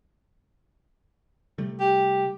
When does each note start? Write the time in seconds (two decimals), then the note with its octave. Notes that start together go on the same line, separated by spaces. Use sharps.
1.58 C3 G3 A3
1.80 G4